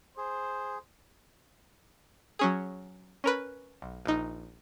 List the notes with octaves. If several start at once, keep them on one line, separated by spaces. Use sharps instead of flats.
G#4 C5
F#3 C#4 G#4
C#4 A#4 B4
B1
A#1 D#4